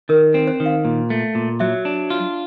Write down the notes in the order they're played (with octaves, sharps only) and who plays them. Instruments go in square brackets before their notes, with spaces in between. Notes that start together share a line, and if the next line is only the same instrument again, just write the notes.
[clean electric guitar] D#3 [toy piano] A#4
[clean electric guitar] C4
[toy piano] C5
[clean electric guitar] D#3
[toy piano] F5
[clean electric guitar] A#2
A3
A#2
[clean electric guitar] F#3 [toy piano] E5
[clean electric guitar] D4
F4